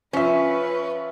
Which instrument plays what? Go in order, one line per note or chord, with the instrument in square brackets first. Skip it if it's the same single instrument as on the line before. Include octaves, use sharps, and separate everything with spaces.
[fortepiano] F3 E5 [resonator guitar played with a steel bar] C#4 [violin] B4